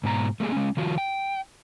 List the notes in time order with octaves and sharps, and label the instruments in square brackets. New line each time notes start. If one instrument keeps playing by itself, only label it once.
[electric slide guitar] G#2 B2 A#5
A3 A#3 G4 G#4
G#3 C#4
D#3 F3 F4 F#4
G5